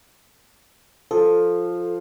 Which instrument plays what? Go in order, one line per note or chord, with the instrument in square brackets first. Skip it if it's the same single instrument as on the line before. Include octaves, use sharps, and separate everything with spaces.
[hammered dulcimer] F3 [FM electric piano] A4